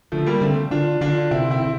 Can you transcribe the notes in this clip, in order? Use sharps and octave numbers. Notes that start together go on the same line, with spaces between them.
D3 F3 A3
G3 A#3
D3 A3 C4
D3 D4 F4
D3 D4 F4
C3 C4 E4
C4 E4
C3